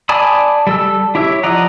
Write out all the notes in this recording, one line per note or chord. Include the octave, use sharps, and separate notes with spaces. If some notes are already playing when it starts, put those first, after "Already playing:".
D5 G#5 A5 B5 D#6
G3 A4 E6
E4 G4 C#5 E5
F3 D5 D#5 F#5 A#5